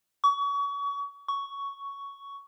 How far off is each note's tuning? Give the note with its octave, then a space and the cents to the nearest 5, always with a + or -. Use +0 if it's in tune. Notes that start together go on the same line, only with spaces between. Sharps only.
C#6 +35
C#6 +10